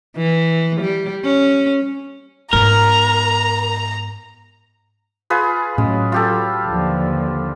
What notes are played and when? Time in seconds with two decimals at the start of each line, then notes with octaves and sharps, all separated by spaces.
0.17 E3
0.81 G3
1.24 C#4
2.53 G#2 B3 A#4 A#5
5.30 F4 G#4 B4
5.78 A2 F#3 G#3 C#4
6.12 F4 G4 A4
6.66 D#2 D3 F3